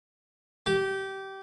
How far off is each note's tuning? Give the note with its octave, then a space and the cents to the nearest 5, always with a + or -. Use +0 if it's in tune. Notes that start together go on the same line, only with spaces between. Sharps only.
G4 -20